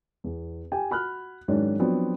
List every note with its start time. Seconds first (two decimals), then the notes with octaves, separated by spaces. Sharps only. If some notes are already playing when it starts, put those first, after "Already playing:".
0.24 E2
0.72 G4 G5 G#5
0.91 F#4 B5 F6 F#6
1.48 G#2 D#3 F#3 C#4 D4
1.79 F3 F#3 B3 C4 D4